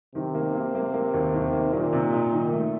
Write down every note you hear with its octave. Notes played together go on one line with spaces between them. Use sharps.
C3 D#3
A#3
A#3
A#3
A#3
D#2
D#3
A#3
A#2 D#3
C3
D#4
D#3
A3